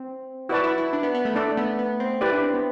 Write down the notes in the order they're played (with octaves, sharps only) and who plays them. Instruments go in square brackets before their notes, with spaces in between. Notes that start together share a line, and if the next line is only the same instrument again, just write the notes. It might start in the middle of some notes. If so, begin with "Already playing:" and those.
Already playing: [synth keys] C4
[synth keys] E4 [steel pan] F#4 B4 D5 A5
[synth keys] E4
E4
D4
B3
B3
A3
[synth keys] A3 [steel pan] D4 A4 D5
[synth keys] B3
B3
C4
[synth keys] E4 [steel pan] G4 B4 D5
[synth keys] D4
C4
B3